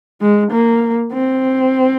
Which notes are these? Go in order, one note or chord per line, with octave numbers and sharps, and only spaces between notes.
G#3
A#3
C4